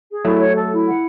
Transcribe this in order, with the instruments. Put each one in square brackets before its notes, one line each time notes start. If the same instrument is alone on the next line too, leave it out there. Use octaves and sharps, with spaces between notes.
[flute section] G#4
[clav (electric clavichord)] F#3 A3 [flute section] E4
[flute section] C#5
A4
E4
F#5